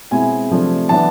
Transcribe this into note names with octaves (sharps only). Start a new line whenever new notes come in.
B2 G#3 C4 E4 G#5
C3 F3 A3 D4
E3 B3 D4 A5